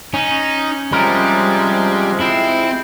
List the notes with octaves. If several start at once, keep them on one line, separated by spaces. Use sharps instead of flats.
C#4 D#4
C3 F3 G3 G#3 A#4
C4 E4